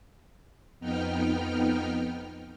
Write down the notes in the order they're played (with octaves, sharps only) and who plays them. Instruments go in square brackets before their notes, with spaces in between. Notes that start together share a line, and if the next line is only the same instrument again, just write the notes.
[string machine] F2 B3 D#4 G5 F6